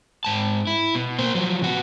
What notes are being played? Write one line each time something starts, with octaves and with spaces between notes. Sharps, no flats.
G#2 A5
E4
B2
A#3 C5
F3 F#3
C3 F#4